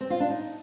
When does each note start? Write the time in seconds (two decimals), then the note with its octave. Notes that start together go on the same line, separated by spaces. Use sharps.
0.01 C4
0.10 F4
0.20 D4
0.30 D#4